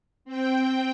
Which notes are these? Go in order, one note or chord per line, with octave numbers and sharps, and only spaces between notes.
C4 G5